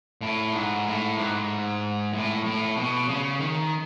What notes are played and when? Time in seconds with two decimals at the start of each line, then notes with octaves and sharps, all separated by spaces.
0.21 A2
0.53 G#2
0.85 A2
1.17 G#2
2.13 A2
2.45 A2
2.77 B2
3.08 C#3
3.40 D#3